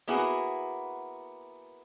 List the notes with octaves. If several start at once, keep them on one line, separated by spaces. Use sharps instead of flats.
A#3 B3 E4 F#4 G#4